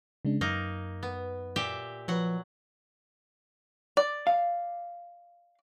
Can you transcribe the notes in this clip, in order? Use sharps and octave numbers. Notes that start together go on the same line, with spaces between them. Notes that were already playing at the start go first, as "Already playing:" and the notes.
C#3 G#3 D4
F#2 A#3 D#4
B3
A#2 G4 E5
F3 F#3 B4 F#5
D5
F5